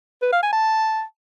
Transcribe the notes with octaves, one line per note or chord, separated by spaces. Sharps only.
B4
F5
G#5
A5